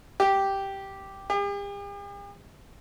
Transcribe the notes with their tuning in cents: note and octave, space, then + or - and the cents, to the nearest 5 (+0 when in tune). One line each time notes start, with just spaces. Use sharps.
G4 -5
G4 +45